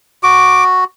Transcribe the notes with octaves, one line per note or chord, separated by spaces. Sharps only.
F#4 D6